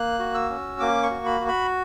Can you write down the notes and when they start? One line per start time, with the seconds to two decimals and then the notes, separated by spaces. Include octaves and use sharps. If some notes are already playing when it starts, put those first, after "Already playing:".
Already playing: A#3 F#6
0.19 F#4
0.34 E6
0.50 C#4
0.80 A#3 D6
1.03 C#6
1.11 F#4
1.26 B5
1.41 F#4
1.48 B5